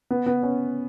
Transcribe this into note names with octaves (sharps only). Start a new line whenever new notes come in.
B3
B3
C#4